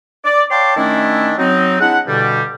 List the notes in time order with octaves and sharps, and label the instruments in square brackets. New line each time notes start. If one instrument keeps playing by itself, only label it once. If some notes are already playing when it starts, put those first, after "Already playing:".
[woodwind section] D5
C#5 F5 G5 A5 C6 D6
D#3 A3 C#4 D4 E4
F#3 C4 D#4
G#3 D4 E4 F#5
G2 B2 D3 G3